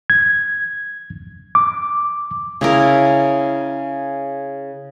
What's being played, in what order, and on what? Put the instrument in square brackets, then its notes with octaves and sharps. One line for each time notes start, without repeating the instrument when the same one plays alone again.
[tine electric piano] G#6
D6
[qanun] C#3 E4 A#4